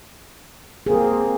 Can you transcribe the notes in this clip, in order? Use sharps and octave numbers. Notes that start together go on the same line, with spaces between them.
A#3 C4 G#4